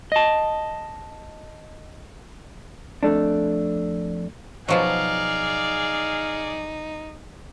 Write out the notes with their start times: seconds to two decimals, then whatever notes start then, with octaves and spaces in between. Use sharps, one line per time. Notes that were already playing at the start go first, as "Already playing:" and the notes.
0.12 D#5 A5
3.03 F2 A3 D4
4.68 B2 F3 F#3 D#4 G#4 D5 F5